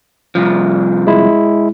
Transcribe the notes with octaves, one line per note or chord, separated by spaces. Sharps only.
C2 F3
G#3 E4